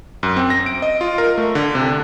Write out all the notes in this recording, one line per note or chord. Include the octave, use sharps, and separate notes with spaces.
F#2
C4
A#6
D7
D#5
F4
A#4
A3
D3
C3
D4